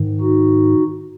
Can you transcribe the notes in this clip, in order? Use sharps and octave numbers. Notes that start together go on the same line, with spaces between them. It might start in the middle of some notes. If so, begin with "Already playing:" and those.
Already playing: G#2 D#3
D#4 F#4